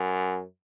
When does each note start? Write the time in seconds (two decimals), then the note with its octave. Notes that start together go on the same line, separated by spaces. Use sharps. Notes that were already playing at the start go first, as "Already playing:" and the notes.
Already playing: F#2